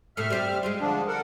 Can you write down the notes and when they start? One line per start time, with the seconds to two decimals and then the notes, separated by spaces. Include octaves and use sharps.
0.17 A2 C3 A3 E5 F6
0.30 G3 C4 G4
0.63 G#3 C4 F4
0.81 D3 F3 D4
1.08 A4 A#4 F#5